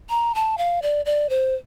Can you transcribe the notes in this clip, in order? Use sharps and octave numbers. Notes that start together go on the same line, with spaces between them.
A#5
A5
F5
D5
D5
C5